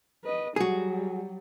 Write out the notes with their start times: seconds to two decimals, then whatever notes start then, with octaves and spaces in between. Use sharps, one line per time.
0.24 B4 D#5
0.56 F#3 G3 F#4 G#4